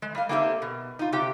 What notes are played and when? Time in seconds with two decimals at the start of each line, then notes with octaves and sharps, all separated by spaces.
0.02 G#3
0.15 G3 D#5 F5
0.29 A#3 C4 D#4 G4 A4 E5
0.62 B2
0.99 D#4 F4
1.13 C3 G4 G5